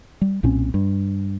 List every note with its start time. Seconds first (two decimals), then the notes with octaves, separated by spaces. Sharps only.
0.21 G3
0.43 B1 A#2 C4 C#4
0.74 G2